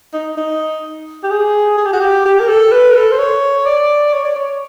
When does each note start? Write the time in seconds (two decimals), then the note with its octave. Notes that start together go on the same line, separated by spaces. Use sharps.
0.13 D#4
0.37 D#4
1.23 G4
1.30 G#4
1.77 G#4
1.85 G4
1.93 F#4
2.00 G4
2.25 G4
2.40 A#4
2.48 A4
2.72 B4
2.91 A#4
2.95 A4
3.12 C5
3.18 C#5
3.66 D5
4.14 C#5
4.25 D5
4.36 C#5